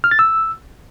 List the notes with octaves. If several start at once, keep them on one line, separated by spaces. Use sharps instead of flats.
F6
A6
E6